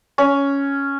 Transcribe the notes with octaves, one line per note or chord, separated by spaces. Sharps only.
C#4